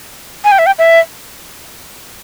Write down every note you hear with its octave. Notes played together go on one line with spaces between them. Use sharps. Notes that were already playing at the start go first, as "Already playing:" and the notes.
G#5
G5
E5
G5
E5